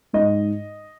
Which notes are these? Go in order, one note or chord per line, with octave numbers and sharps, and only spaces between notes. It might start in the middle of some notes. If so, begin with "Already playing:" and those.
G#2 D#5